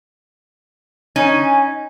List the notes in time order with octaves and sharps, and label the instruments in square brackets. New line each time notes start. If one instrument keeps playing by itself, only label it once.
[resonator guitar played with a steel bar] C#4 D#4 [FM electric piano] G#5